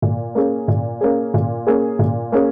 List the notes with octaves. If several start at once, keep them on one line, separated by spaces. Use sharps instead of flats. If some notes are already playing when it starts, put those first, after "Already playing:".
A#2
A#3 C#4 G#4
A#2
A#3 C#4 G#4
A#2
A#3 C#4 G#4
A#2
A#3 C#4 G#4